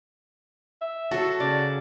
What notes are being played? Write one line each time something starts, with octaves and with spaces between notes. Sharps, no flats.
E5
F#3 F#4 A4 A5
C#3 D5